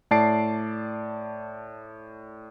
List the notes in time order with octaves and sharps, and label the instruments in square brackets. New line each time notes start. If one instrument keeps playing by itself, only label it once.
[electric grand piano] A2 D5 A5 C7 D7